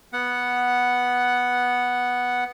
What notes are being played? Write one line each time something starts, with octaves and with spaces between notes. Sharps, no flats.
B3 F#5